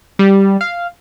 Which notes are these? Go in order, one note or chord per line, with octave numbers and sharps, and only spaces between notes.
G3
F5